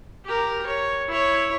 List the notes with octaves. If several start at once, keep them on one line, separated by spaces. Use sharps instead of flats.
G4 A#4
C#5
E4 C#5